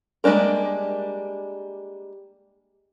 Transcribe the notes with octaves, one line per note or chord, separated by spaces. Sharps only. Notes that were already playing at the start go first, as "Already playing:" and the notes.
G3 G#3 A#3 D4 A#4